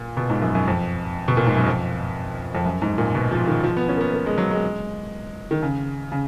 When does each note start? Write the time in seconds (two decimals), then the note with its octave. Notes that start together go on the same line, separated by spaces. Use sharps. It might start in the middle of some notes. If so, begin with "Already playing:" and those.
Already playing: A#2
0.17 B2
0.30 G#2
0.42 F#2
0.55 F#2
0.68 F2
1.28 B2
1.37 A#2
1.46 G#2
1.56 F#2
1.66 F2
2.55 F2
2.65 F#2
2.82 G#2
2.98 A#2
3.15 B2
3.32 F3
3.47 D#3
3.64 F3
3.77 B3
3.89 C#4
3.97 A#3
4.01 B3
4.14 A#3
4.26 G#3
4.38 F#3
4.51 G#3
5.51 D#3
5.62 C#3
6.12 C#3